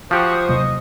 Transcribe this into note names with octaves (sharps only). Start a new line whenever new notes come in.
F3 F#4 G4 C5 C#6 D#6
C3 F#3 A#3 D#5